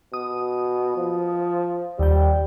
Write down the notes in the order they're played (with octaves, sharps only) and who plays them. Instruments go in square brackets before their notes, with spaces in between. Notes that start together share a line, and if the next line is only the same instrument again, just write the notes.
[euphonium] B2 [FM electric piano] D#6
[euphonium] F3
[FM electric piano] D#2 G5 [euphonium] G3